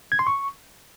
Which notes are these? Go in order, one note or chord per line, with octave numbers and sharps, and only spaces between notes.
G#6
C6
C#6